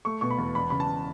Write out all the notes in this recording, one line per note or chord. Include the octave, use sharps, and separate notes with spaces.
A3 C#6
B2 C#6
B5
E2
E1 B5
C#3 B5
A5